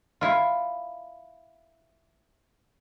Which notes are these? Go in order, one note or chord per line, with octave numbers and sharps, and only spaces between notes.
E4 F4